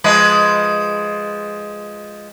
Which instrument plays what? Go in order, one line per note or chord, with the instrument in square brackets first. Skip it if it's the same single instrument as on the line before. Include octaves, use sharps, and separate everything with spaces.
[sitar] F3 G#3 B4